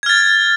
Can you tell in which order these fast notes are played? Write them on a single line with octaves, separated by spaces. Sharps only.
G#6 F6 A6